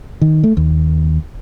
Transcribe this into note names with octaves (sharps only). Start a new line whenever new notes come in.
D#3
A3
D#2